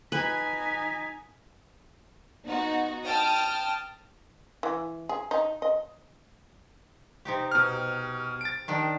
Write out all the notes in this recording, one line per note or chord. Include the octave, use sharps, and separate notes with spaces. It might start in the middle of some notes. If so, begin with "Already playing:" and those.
D#4 B4 G#5 B6
B3 D#4 F#4
G5 A5 D#6 F6
E3
G#4
D#4
D#5
C3 D#4 G4
B2 F6
A6 D7
D#3 D4 G4